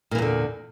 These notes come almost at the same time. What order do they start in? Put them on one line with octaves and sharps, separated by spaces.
A#2 E3 E2 D3